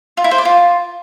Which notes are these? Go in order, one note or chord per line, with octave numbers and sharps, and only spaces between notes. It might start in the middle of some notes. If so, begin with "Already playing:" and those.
F4
E4
C5
D5
F4